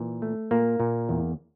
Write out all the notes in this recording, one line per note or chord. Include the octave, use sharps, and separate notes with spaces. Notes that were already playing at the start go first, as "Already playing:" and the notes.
Already playing: A#2 E3
A3
A#2 A#3
A#2
E2